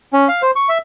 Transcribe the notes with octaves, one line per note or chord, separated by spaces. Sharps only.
C#4
F5
C5
C#6
E5